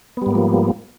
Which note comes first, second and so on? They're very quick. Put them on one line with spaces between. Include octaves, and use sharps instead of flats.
B3 G3 G#2 A#3 F3